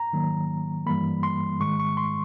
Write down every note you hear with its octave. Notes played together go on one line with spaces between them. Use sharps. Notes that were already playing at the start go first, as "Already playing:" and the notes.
Already playing: A#5
G#2 D#3 F#3 A#3
G2 E3 G3 A#3 B5
C6
G#2 D#3 G#3 C#6
C#6
C6